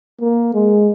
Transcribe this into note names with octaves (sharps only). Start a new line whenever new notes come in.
A#3
G#3